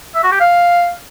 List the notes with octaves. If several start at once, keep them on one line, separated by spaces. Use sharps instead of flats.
E5
F#4
G4
F5